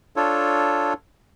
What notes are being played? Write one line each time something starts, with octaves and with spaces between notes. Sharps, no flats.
D4 F4 A4 C#5